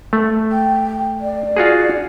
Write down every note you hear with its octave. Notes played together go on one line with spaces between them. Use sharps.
A3
G5
D5
F4 F#4 G#4